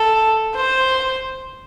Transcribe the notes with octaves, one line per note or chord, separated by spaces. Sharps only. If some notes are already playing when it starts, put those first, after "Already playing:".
Already playing: A4
C5